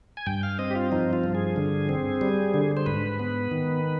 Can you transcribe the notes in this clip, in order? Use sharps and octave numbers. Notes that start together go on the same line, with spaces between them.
G#5
G2 G5
F5
C4 D#5
G4
F4
F3 D#4
F4
G2
G#4
D3
C4
G3
D3
C5
G#2 B4
B3
D#3